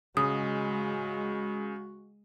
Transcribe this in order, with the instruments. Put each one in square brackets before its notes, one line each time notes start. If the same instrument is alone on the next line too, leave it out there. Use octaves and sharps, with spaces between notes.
[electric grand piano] C#3 [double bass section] G#3 [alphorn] F#4 [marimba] D#6